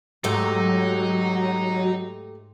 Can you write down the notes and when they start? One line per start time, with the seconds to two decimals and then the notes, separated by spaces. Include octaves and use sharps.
0.24 G#2 F#3 A3 D#4 G4 A4